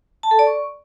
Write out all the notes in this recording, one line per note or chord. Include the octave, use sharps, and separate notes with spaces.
A5
A4
D5
C#6